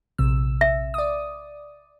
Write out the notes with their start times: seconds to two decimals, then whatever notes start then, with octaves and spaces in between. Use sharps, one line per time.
0.18 A#1 C3 E6
0.61 E5
0.94 D5 D#6